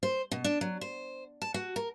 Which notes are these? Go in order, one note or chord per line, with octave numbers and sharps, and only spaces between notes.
C5
B2
D4
F#3
C5
A5
F#4
A#4